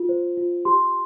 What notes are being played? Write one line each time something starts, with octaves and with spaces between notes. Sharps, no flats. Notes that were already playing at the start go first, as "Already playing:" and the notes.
Already playing: F4
C5
F4
G4 C6